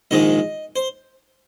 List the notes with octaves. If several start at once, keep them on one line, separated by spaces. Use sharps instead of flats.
A#1 G#2 D#3 G#3 D#5
C5